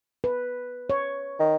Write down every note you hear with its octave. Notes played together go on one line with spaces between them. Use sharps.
B4
C#5
D#3